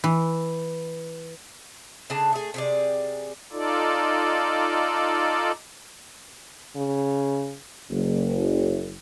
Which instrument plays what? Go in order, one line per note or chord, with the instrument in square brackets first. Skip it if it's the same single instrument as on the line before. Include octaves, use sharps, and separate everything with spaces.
[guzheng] E3
[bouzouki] C#3 D4 G#4 A5
A3 G#4
C3 G#4 D5
[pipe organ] D#4 F4 A4 D5
[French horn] C#3
[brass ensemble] F#1